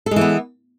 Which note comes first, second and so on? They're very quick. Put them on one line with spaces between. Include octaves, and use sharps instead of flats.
A4 G#3 E3 B3